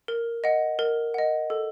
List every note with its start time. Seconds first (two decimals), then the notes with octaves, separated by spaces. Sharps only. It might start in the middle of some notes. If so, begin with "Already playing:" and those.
0.08 A#4
0.44 D#5 F#5
0.79 A#4
1.14 D#5 F#5
1.50 A4